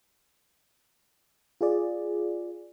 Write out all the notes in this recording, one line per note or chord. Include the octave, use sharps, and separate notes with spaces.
F4 G#4 D5